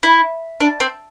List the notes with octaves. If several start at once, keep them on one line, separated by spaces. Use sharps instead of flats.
E4
D4
C4